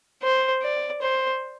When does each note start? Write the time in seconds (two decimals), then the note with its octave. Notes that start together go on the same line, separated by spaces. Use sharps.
0.23 C5
0.63 D5
1.02 C5